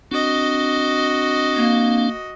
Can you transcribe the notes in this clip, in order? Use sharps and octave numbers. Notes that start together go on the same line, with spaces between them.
C4 D4 F#4 D#5
A#3